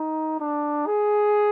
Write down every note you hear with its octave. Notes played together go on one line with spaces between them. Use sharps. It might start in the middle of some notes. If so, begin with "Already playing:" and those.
Already playing: D#4
D4
G#4